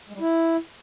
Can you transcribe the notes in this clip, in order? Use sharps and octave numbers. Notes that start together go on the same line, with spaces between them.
G#3
G3
E4